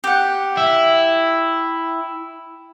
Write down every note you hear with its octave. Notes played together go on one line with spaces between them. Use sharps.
G4 F#5
E4